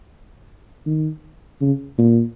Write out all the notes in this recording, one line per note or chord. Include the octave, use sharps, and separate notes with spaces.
D#3
C#3
A#2